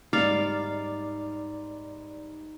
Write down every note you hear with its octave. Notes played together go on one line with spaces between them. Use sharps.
G#2 G3 D#4 D5 F5